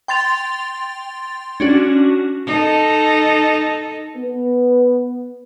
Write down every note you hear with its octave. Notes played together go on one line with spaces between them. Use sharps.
G5 C6 A6 F7
C#4 D4 F#4
D#4 A4
B3